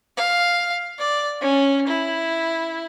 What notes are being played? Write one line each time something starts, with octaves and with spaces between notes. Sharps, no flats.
F5
D5
C#4
E4